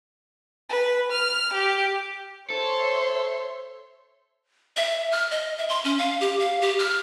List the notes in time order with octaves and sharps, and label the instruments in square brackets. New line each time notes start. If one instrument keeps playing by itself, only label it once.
[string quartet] B4
F6
G4
[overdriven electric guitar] A4 [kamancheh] C5 E5 [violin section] C#5 C6
[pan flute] E5
F6
D#5
E5
C6
C#4
F5
G4
F5
G4
F6